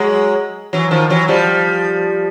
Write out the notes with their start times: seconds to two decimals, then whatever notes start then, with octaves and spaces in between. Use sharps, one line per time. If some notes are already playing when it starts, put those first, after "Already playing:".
Already playing: F#3 G#3
0.73 E3 F#3
0.91 D#3 F3
1.10 E3 F#3
1.28 F3 G3